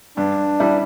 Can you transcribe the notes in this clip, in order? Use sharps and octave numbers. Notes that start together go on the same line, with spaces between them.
G2 D4
G3 E4